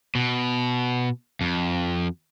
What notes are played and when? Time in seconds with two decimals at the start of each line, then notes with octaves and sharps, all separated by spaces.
0.15 B2
1.41 F2